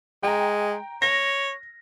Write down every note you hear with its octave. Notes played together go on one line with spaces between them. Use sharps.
G#3 G5 A#5
C#5 A#6